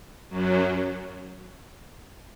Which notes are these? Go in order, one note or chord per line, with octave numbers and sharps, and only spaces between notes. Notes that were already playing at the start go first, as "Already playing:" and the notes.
F#2 F#3